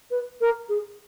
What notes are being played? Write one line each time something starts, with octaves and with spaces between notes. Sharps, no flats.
B4
A#4
G#4